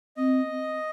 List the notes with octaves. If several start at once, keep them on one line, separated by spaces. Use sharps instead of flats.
C4 D#5